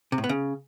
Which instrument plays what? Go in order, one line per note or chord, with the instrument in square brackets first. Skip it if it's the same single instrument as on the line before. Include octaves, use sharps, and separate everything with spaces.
[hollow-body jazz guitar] C3
A2
B3
C#3